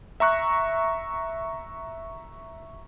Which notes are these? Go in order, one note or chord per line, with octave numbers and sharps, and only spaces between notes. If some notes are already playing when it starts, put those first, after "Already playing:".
E5 A#5 C#6 F#6